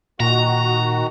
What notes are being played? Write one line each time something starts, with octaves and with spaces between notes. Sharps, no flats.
A#2 D#3 F#4 A#5